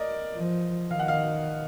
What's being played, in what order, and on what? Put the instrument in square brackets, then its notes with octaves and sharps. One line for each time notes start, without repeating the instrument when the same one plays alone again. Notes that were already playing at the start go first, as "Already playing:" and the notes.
Already playing: [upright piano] A#4 D5 D#5
[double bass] F3
[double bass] D#3 [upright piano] F5
[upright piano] F#5
F5